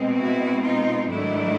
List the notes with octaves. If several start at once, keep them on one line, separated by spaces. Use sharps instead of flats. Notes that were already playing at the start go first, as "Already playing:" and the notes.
Already playing: B2 G#3 C4
E4 F#4
D#4 F4
G#2 D#3 F#3 A3 D4 E4